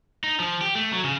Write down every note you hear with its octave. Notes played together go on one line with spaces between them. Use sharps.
D#4
F3
G4
A3
F#3
C#3